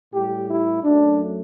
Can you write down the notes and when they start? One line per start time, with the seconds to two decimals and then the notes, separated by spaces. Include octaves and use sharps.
0.13 A2 G3 G4
0.49 E4
0.83 F#2 F#3 A3 D4